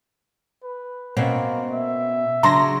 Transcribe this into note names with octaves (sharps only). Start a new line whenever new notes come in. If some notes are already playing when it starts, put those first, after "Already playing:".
B4
B2 A#3 C4 C#4
E5
C#3 F#3 D4 A#5 C6 A#6